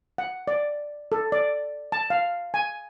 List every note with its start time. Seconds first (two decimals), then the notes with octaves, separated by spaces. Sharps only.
0.18 F#5
0.48 D5
1.12 A4
1.32 D5
1.92 A5
2.10 F5
2.54 G#5